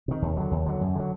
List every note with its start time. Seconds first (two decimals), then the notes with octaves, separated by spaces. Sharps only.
0.08 C3 D#3
0.22 D#2
0.37 D3 F#3
0.51 D#2
0.66 D3 F#3
0.81 F#2
0.95 D3 F#3